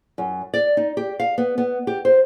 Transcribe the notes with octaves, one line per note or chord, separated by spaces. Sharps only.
F#2
D5
D#4
G4
F5
B3
B3
G4
C5